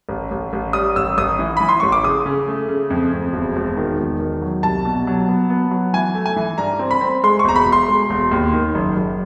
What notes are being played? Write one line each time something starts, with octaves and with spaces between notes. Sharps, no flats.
A1
A1
A1
G3 D#6
A1 E6
A1 D#6
E3
E3 B5
C6
A1 C#6
D6
C#3 D#6
C#3
A3
C#3
F2
F2
E1
E1
D#3
E1
D#3
F#3
C2 A5
B2
F#3
B3
B3
F#3
E3 G#5
A3
G#5
E3
G2 A#5
C4
B5
C4
G#3 C6
C#6
E1 A#5
B5
E1
C6
G#3
E1
D#2
D#3
F#1
F#1